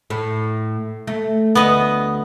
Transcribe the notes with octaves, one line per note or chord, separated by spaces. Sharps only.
A2
A3
D2 B3 D#5